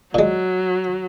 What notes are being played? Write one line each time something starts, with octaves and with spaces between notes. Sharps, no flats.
A#2 F#3 G#3